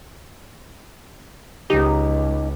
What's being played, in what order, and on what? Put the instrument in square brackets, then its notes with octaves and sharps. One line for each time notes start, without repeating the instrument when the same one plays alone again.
[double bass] C#2 [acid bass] D#4 [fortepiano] G4